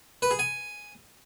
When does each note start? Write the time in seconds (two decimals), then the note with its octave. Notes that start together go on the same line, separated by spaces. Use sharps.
0.22 B4
0.31 G#4
0.39 G#5